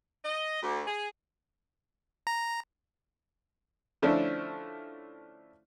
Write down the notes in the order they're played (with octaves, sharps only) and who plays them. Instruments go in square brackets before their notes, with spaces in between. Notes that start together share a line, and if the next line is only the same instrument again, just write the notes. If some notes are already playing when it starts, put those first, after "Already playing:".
[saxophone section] D#5
D2
G#4
[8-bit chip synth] A#5
[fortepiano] D3 F3 A3 C#4 D4 E4